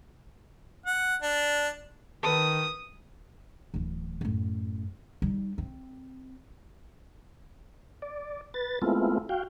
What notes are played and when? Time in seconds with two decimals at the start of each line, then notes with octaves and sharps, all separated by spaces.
0.86 F#5
1.22 D4
2.23 D#3 A4 B4 D#6
3.74 D1 E3
4.21 F#2 A2
5.22 G3 D#4
5.58 C4
8.02 D5
8.54 B4 A6
8.82 G#3 A3 B3 C4 E4 F4
9.29 F#4 F5 G5